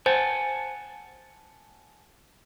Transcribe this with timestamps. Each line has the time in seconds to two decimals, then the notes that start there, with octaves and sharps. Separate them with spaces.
0.06 C5 F#5 G#5 A5